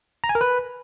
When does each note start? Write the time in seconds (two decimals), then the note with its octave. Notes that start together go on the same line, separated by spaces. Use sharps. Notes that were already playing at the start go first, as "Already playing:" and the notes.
0.24 A#5
0.29 G#5
0.35 A#4
0.41 B4